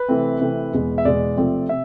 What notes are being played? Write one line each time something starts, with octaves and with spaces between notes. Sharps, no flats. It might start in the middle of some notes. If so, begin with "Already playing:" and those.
Already playing: B4
C3 E3 A3 C4
C3 E3 A3 C4
E2 B2 G#3
E5
E2 B2 G#3 D5
C3 F3 A3 C4
C3 E5